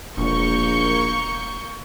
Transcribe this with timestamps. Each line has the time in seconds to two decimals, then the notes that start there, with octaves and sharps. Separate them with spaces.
0.17 E1 A#1 A#3 C#6 G6